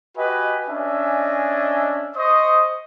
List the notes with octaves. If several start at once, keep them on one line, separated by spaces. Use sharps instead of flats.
F#4 G4 B4 D#5 G#5
C#4 D4 D#5 E5 G#5
C5 D#5 C#6 D#6